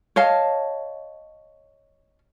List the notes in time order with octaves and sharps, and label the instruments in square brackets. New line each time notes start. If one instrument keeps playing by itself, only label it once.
[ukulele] C#5 D#5 F5 A5